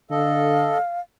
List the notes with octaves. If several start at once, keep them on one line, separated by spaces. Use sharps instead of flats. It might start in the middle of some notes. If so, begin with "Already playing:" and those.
D3 A4 D#5 F5